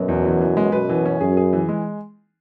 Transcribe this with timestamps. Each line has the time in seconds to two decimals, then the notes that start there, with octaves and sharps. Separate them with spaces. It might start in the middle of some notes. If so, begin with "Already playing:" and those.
Already playing: F#2 B2 F#3
0.08 E2
0.25 E3
0.41 E3
0.57 G#3
0.72 F#2 B2 B4
0.90 E3
1.06 C#4
1.21 F#2 G#4
1.37 G#4
1.53 E3
1.69 G#3